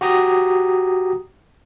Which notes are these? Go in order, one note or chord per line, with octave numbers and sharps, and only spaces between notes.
F#4 G4 A#5 D#6